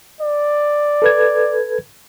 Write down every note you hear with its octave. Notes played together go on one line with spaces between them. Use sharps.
D5
A4 B4 G#6